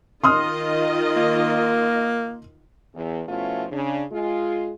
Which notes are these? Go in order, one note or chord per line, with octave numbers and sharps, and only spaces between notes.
D#3 F4 D#5 C6 D#6 F6
A#3
E2
B2 F3 A3 C#4 E4 F4
C#3 D4
G#3 F4 G#4